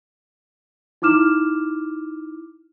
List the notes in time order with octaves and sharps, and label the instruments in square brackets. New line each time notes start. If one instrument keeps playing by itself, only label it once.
[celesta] D#4 E4 D6 F6 E7